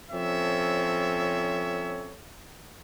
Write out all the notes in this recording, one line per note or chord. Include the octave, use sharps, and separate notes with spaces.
F3 C4 C#4 A4 C#5 E5